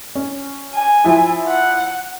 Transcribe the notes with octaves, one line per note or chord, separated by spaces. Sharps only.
C#4
G#5
F3 E4
F#5